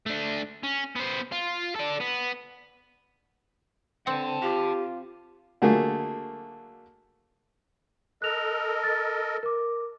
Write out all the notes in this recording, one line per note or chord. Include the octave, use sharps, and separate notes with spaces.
A3 D4
C#4
B3 C5
F4
A4 D5
B3
D3 C4 F#5 A5
F4 G4
D3 F#3 A3 A#3 G#4
A4 A#4 D#5 F#6 F7
A6
A#4 D6